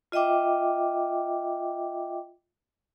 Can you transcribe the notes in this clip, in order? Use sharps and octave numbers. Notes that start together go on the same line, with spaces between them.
F4 D#5 E5 G5 D6